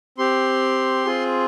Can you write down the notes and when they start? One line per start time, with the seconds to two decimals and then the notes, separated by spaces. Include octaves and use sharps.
0.18 C4 G4 C6
1.05 C4 F4 G#4